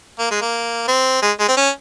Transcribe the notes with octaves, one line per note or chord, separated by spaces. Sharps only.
A#3
G#3
A#3
C4
G#3
G#3
C4
C#4